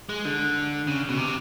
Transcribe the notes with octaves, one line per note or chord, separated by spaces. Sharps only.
G#3
D3
C#3
B2
C3